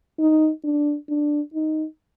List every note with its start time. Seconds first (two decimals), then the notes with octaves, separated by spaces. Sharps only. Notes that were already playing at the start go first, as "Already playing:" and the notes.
0.19 D#4
0.64 D4
1.09 D4
1.54 D#4